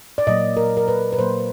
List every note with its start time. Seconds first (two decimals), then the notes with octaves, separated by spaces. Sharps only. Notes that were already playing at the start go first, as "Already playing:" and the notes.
0.18 D5
0.27 A#2 F#3 A#3 D#5
0.57 A#4
0.77 A#4
0.88 B4
1.13 B4
1.18 A#2 F#3 A#3 C5